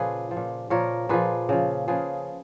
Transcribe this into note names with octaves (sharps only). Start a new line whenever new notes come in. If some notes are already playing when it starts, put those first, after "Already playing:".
Already playing: A#2 C#3 F3 F4 G#4 B4
F3
A#2
A#2 F3 A#4 C#5
A#2 F3 G#4 B4
C#3 F3
C#3 F3 G#4 B4